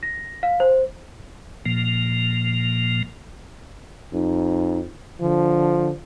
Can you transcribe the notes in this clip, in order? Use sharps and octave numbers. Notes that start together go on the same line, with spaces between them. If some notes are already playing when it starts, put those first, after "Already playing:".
A#6
F5
C5
A#2 F3 A#3
F2 D#4
D3 F3